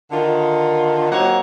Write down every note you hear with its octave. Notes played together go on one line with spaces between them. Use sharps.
D3 D#3 F4
F#3 A#3 C4 D#4 C#5 F#5